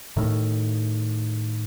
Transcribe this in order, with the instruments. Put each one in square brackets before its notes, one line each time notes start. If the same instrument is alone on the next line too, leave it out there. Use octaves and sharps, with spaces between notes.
[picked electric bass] A2 D#3